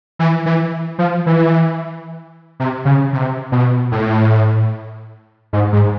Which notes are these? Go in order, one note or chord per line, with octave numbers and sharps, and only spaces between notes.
E3
E3
F3
E3
C3
C#3
C3
B2
A2
G#2
G#2